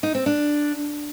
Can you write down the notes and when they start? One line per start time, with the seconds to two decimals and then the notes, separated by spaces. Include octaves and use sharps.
0.03 D#4
0.15 C4
0.26 D4